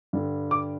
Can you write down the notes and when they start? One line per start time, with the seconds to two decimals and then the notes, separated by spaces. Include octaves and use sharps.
0.13 G2 D3
0.51 D6